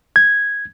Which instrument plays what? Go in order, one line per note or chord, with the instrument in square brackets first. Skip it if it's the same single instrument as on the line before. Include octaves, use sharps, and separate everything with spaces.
[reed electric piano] G#6